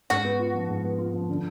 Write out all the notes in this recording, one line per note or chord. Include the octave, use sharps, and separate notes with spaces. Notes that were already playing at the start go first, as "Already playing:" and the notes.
G#2 F#4
B3
F4
F3
G#2
B3
F4
F3
D3